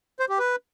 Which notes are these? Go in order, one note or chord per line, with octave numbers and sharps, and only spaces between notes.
C5
G4
B4